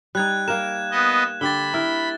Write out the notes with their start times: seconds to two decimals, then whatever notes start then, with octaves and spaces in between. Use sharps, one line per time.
0.15 G3 D#4 F#6 G#6
0.48 A#3 A#4 E7
0.91 B3 D#5
1.41 D3 G4 B5 A6 G7
1.74 E4 A#4